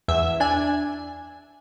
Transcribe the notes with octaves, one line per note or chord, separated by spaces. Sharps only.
E2 E5
D4 G#5